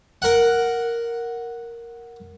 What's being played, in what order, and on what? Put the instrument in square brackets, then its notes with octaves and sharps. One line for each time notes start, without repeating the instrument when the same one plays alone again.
[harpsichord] A#4 F#5